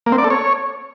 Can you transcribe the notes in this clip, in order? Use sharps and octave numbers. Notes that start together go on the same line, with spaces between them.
A#3
C4
D5
A4
C#5